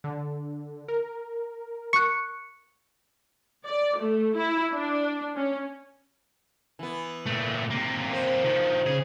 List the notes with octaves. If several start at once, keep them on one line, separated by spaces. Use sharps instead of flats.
D3
A#4
C#6 F#6 C#7
D5
A3
E4
D4
C#4
E3 B3
A#2 A3
C3 A#3
C5
D#3 F3
C#3 G#4